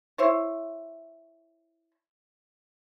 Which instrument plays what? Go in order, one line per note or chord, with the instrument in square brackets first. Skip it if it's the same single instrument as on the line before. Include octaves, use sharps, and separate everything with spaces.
[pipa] E4 C5 C#5